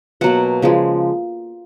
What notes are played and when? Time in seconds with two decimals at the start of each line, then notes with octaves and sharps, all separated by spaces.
0.21 B2 F#3 A#3 F#5
0.62 C#3 F3 G#3